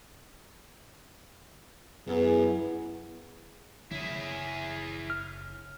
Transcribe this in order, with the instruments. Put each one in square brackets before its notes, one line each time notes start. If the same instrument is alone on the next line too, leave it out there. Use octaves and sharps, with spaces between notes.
[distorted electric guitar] F#2 [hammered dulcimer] E3 [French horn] B3 [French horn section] G#4
[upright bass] F#1 [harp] C#3 [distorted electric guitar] E4 G#4
[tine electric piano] F6